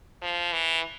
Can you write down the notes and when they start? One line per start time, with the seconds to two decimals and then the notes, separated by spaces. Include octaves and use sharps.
0.22 F3
0.53 E3